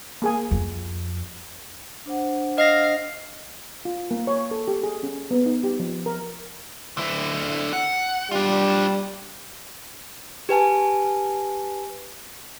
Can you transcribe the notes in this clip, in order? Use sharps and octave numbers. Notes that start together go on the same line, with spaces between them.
A#3 G#4 G#5
F2
D4 C5 F#5
D#5 F5 A#6
F4
A#3
C#5
A4
G4
G#4
C#4
B3
D#4
G4
F3
A#4
D3 E4
F#5
G3 D4 F4
G4 B4 G#5 A5